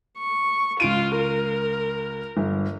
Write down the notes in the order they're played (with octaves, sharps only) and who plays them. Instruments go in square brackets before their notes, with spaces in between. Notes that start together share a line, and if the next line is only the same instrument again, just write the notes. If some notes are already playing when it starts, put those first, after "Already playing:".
[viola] C#6
[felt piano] C#2 D7 D#7 [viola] F4
[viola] A#4
[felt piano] G1